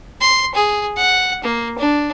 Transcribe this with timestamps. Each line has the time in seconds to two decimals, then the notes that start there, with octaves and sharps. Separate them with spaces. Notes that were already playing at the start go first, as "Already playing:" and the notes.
0.21 C6
0.54 G#4
0.97 F#5
1.44 A#3
1.78 D4